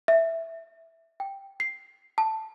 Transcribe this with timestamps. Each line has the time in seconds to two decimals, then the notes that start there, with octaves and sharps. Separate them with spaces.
0.08 E5
1.20 G5
1.60 C7
2.18 A5